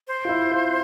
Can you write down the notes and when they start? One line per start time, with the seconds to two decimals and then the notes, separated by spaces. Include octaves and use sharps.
0.08 C5
0.25 F4
0.29 E4
0.51 F4